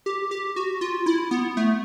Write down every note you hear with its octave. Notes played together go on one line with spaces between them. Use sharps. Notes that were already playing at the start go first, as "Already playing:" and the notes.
G4
G4
F#4
F4
E4
B3
A3